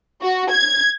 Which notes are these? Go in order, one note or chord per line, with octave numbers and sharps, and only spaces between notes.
F#4
G#6